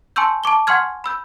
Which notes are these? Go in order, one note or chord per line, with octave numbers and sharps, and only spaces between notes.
G#5 A5 C6 C#6 E6 G6
A5 C#6 D6 G7
F#5 G#5 C6 C#6 F6 G#6
B5 E6 G6